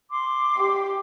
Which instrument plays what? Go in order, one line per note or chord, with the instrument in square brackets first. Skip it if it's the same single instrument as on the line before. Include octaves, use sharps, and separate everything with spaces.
[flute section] C6 D6
[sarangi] G4